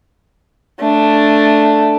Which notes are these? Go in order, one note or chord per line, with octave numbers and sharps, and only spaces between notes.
A3 D4